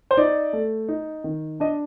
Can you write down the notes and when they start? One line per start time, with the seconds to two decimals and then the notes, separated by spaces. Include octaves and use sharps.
0.11 C5
0.17 D#4 D5
0.53 A3
0.89 D#4
1.24 D#3
1.60 D4 D#5